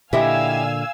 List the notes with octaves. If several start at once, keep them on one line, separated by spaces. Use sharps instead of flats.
A#2 D3 E4 G4 D#5 F5 G#5 E6